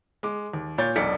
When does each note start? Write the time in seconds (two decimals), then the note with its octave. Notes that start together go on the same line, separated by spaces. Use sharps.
0.23 G#3 D6
0.53 D#2
0.78 A#2 C#5 G6 A6
0.96 E1 B1 D5 B6 C#7